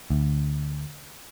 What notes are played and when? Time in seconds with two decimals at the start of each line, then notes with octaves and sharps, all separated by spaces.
0.10 D2